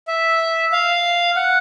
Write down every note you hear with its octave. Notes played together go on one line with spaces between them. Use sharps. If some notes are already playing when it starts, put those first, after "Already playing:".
E5
F5
F#5